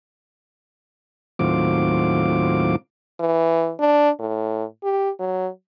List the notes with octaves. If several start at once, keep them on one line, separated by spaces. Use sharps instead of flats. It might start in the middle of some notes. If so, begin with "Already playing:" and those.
D#2 A2 F#3 C4 F4 D6
E3
D4
A2
G4
F#3